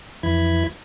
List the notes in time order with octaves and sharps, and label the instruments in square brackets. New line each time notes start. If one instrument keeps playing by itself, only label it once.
[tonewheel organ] F2 E3 E4 B5 G#6